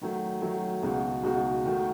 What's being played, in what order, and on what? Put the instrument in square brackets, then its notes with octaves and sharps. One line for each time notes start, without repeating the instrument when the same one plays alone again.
[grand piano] D#3 F#3 A3
D#3 F#3 A3
C#2 B2 G#3 D#4 F#4
C#2 B2 G#3 D#4 F#4
D#3 A3 D#4 F#4